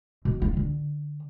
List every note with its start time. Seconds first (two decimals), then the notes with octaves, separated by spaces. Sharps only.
0.25 B2
0.42 F4
0.57 D3